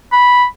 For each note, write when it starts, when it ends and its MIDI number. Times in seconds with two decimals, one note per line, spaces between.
0.12 0.45 83